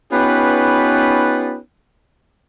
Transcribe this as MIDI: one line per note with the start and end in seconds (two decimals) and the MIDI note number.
0.12 1.58 59
0.12 1.58 61
0.12 1.58 63
0.12 1.58 65
0.12 1.58 67
0.12 1.58 71